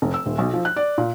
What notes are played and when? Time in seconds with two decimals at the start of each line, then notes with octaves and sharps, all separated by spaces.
0.02 F1
0.14 E6
0.26 D#1
0.38 B1
0.54 F3
0.65 F#6
0.76 D5
0.98 A#2